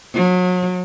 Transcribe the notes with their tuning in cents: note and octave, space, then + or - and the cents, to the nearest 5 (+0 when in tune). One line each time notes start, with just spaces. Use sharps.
F#3 -35